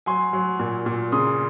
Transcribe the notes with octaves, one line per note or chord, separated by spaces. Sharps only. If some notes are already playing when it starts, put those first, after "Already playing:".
F#3 G#5 C6
F#3
A#2
A#2
C#3 C6 D#6